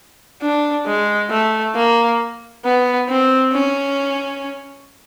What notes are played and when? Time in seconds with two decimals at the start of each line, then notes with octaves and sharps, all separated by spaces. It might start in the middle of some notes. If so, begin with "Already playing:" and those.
0.42 D4
0.86 G#3
1.31 A3
1.76 A#3
2.65 B3
3.09 C4
3.53 C#4